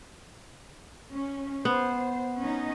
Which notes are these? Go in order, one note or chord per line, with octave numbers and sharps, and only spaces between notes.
C#4
B3 C5
C#4 D#4 D#5